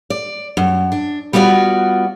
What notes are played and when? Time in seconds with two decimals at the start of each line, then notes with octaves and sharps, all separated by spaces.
0.10 D5
0.57 F#2
0.92 D4
1.33 G3 B3 F4 F#4 D5